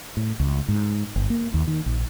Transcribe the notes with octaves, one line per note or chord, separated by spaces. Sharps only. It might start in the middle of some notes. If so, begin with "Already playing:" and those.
A2
C#2
G#2
G1
A#3
D#2
D#3
A#1